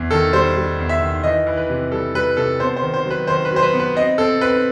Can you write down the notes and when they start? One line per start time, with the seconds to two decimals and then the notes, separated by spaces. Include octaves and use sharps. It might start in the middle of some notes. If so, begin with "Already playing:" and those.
Already playing: E2
0.11 D#3 A4
0.33 G3 C5
0.56 G3
0.79 E2
0.89 E5
1.02 D#3
1.24 E3 D#5
1.47 E3
1.57 B4
1.70 C3
1.92 G3 A4
2.14 G3 B4
2.37 C3 A4
2.60 B3 C5
2.76 C5
2.82 D#3
2.94 C5
3.06 F#3 B4
3.27 D#3 C5
3.45 B4
3.51 F#3 C5
3.63 B4
3.73 B3
3.80 B4
3.95 C4 D#5
4.18 C4 A4
4.41 C4 B4